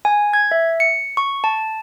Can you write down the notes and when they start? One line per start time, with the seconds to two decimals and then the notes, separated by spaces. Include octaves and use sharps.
0.05 G#5
0.33 G#6
0.51 E5
0.80 C#7
1.17 C#6
1.44 A5